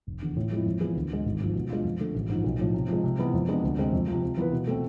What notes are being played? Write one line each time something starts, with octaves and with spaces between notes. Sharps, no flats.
F1
E2 D3
A2
F3 G#3 C4 E4
F2
E3 B3 F4 G#4
D2
D3 G#3
G#1
G#2 F3
B2
G#3 D4 F4
F2
D3 A3
A1
G#2 F3
B1
A2 F3
C3
F3 G#3
C3
E3 G#3 B3 E4
F2
C3 G#3 B3 D4
D2
C3 G#3 C4
F2
C3 F3
C3
E3 B3 F4 B4
B2
A3 C4